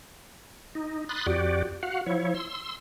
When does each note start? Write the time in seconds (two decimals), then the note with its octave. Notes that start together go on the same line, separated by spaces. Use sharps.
0.75 D#4
1.09 B5 C6 D#6 F#6 A6
1.26 F2 F#4 G4 D5
1.83 F#4 F5 F#5
2.06 F3 E4 C#5
2.34 C6 E6